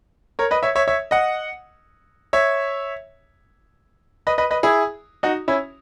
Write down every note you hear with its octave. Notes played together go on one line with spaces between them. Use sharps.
A#4 C#5
B4 D#5
C#5 E5
C#5 E5
C#5 E5
D#5 F#5
C#5 E5
B4 D#5
B4 D#5
B4 D#5
E4 G#4
D#4 F#4
C#4 E4